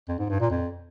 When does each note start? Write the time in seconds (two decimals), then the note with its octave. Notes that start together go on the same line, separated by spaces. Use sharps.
0.08 F2
0.19 G#2
0.29 G2
0.40 A#2
0.51 F2